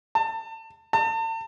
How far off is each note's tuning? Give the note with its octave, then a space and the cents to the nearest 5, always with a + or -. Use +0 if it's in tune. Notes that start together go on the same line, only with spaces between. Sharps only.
A5 +30
A5 +40